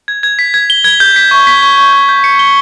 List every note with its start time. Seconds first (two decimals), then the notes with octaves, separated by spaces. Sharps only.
0.08 G#6
0.23 G#6
0.39 B6
0.54 G#6
0.70 G7
0.84 G#6
1.00 G6
1.16 B6
1.31 C#6
1.47 B6
1.62 C#6
1.77 C#6
1.93 G6
2.09 G6
2.24 C#7
2.39 G7